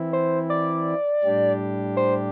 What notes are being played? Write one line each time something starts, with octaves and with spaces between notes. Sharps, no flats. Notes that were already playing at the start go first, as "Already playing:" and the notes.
Already playing: E3 C4 E4
C5
D5
A2 G3 D4 G4
C5